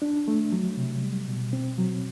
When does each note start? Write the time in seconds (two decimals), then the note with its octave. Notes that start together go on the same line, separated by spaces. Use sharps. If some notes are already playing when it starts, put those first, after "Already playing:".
0.02 D4
0.28 A3
0.52 F#3
0.77 C3
1.03 G3
1.28 B2
1.53 C4
1.78 F#3